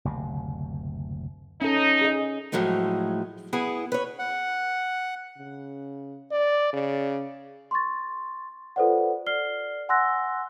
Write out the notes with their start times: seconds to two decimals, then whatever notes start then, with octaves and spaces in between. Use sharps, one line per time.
0.05 F#1 D2 C3
1.61 C#4 D#4 A4
2.01 G#4 D#5
2.52 A2 F3 F#3 G#3 A3
3.53 B3 E4 G#4 F#5
3.92 B4 C#5
4.19 F#5
5.38 C#3
6.32 D5
6.73 C#3
7.71 C6 C#6 A6
8.76 F4 A4 B4 C5 D5 F#5
9.27 D5 F6 C7 G7
9.89 F#5 G#5 C6 E6 F#6 A#6